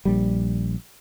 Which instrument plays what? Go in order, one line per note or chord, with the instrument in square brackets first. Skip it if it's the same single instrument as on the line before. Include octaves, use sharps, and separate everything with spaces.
[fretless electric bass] A#1 G3